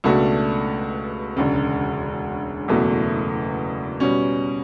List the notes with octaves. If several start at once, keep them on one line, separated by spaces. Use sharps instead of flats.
C#2 B2 A3 D4 F#4
E1 D2 C#3
F#1 E2 B2 A3
B2 G3 C#4